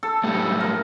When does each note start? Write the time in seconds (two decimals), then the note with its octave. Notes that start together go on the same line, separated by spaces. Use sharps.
0.03 A4
0.24 F#2 A2 G3
0.60 A#4